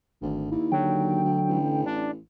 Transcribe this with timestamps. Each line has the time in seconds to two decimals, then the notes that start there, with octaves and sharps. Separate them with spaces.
0.22 G#1 D2
0.51 D#2 E4
0.72 D3 F#3 G5
1.24 D2
1.49 A1
1.86 D4